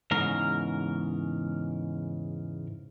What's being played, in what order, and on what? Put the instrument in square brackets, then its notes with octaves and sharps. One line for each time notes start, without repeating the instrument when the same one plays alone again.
[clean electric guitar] E2 G#2 C#3 A#4